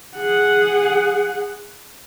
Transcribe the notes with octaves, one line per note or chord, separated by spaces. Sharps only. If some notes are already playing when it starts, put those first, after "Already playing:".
G#4 F#5